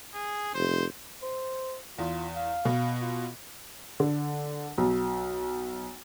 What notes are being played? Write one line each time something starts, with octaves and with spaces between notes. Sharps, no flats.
G#4
F1 C5
C5
E2 F4
F5
B2
F4
D3
B1